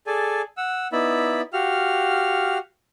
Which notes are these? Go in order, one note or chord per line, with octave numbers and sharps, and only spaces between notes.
G#4 A4 D5 G#5
F#5 E6
B3 D#4 E4 D5 E5 B5
F#4 G4 F5 F6